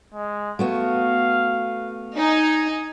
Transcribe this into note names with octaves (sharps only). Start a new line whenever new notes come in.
G#3
A3 B3 F#4 F5
D#4 G#5